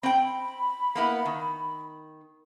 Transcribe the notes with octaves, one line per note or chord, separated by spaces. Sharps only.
C4 G5 B5
A#3 B3 E4
D#3